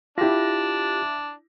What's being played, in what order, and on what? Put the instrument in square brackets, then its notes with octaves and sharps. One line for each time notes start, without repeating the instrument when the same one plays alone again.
[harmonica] D4 [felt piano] E4 A#6 [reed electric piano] F4 G4